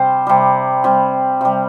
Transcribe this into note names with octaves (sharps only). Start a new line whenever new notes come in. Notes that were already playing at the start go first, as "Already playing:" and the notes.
Already playing: C3 G3 C5
C3 G3
C3 G3
C3 G3